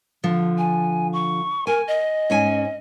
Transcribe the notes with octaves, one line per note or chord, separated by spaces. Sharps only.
D3 F3
G#5
C#6
A#4 G#5
D#5
G#2 C#4 G#5